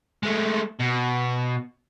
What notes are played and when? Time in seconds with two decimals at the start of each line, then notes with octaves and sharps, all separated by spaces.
0.23 G#3 A3
0.80 B2